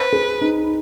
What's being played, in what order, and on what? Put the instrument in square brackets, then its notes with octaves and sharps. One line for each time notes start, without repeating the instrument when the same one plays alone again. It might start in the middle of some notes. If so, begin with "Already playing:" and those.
Already playing: [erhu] B4 [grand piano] C5
[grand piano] G#4
D#4